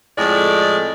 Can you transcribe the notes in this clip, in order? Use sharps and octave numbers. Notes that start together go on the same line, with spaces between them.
F2 A2 G#3 D5